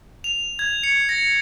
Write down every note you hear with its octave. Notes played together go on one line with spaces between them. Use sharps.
F7
G#6
C#7
A#6